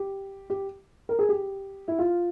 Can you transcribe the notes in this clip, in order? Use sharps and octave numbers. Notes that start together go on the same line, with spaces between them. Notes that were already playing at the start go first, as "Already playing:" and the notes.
Already playing: G4
G4
A#4
G#4
G4
E4
F4